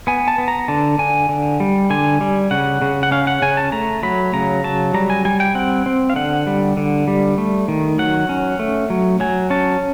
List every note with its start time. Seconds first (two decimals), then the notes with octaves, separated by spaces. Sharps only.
0.07 B3 G#5
0.28 A5
0.38 B3
0.48 A#5
0.68 D3 A5
0.99 D3 G#5
1.29 D3
1.60 G3
1.90 D3 G#5
2.21 G3
2.51 C#3 F#5
2.82 C#3
3.03 F#5
3.11 C#4 F5
3.27 F#5
3.42 C#3 G#5
3.57 A5
3.72 A3 A#5
4.03 F#3 B5
4.34 C#3 A#5
4.64 F#3 A5
4.94 G3 A#5
5.10 G#5
5.25 G3 G#5
5.40 G5
5.55 C4 F#5
5.86 C4
6.10 F5
6.16 D3 F#5
6.47 G3
6.77 D3
7.08 G3
7.38 A3
7.68 D#3
7.98 F#3 F#5
8.29 C#4
8.59 A3
8.90 F#3
9.20 F#3 G#5
9.50 C#4 A5